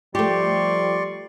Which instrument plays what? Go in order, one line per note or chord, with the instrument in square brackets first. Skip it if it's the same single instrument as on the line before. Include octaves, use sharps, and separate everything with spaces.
[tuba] F3 [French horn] G3 [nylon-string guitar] A3 G4 [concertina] D5 C6 C#6